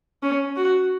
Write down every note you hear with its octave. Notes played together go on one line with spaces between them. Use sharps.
C#4
F#4